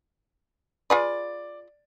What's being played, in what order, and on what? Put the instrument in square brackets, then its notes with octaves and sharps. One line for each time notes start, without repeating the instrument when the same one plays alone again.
[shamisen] F4 G#4 B4 [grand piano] D5